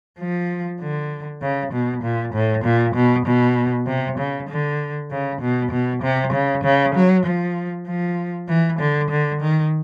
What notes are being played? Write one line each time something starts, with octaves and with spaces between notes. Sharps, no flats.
F3
D3
C#3
B2
A#2
A2
A#2
B2
B2
C3
C#3
D3
C#3
B2
B2
C3
C#3
C#3
F#3
F3
F3
E3
D3
D3
D#3